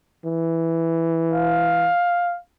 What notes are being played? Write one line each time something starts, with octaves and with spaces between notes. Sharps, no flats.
E3
F5